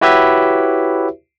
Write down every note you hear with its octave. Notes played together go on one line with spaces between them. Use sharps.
E4 F#4 G4 B4 C#5 E5